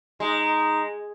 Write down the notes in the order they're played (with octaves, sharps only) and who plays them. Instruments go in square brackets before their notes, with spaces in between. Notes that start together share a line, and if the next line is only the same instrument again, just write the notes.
[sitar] G#3 [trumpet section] D#4